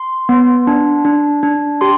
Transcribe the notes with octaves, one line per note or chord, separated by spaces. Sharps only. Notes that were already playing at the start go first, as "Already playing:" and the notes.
Already playing: C6
B3
D4
D4
D4
G4 C6